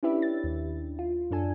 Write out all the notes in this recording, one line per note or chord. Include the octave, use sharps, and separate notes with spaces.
C#4 D4 E4 G4 B4 E5
A6
D#2
F4
F#2 D4 A4 G#5